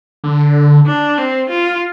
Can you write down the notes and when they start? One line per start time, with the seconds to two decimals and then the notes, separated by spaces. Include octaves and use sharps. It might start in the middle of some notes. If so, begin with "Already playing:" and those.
0.24 D3
0.86 D4
1.18 C4
1.50 F4